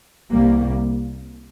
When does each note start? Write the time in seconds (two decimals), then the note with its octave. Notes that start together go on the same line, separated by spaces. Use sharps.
0.31 C2 C3 G3 A#3